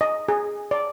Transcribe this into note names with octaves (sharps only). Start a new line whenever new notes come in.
D#5
G#4
D5